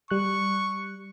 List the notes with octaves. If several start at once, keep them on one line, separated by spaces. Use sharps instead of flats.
G3 C#6 F#6